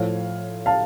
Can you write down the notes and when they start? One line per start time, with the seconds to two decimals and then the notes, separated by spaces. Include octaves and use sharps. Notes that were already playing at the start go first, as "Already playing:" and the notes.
Already playing: A2 F3 C#5 F5
0.66 F5 A5